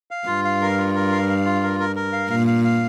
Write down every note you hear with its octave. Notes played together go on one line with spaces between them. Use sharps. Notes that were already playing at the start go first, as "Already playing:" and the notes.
F5
G2 F4
F5
A#4
F4
A#4
F5
F5
F4
A#4
A#4
A#4
F5
A#2 F5
F5
F5